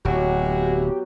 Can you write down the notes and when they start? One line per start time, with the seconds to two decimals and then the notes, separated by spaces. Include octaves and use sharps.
0.05 D1 B2 F#3 G#3 E4 F#4 G4